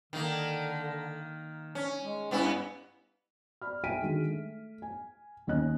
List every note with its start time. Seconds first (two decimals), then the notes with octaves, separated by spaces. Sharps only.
0.13 D3 D#3 A#3
1.75 C#4
2.02 G#3
2.31 G2 B3 C#4 E4
3.62 D5 B5 F6
3.84 E5 G5 G#5 B6 D7 D#7
4.01 D3 D#3 G#3 F#4
4.29 A3
4.82 G#5
5.47 D#2 C#4 D#5 F#6